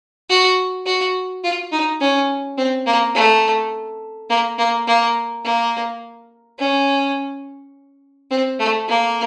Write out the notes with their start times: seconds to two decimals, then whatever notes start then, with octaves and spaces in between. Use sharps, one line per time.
0.29 F#4
0.86 F#4
1.43 F4
1.72 D#4
2.01 C#4
2.57 C4
2.86 A#3
3.15 A3
4.29 A#3
4.58 A#3
4.87 A#3
5.44 A#3
6.59 C#4
8.30 C4
8.59 A3
8.88 A#3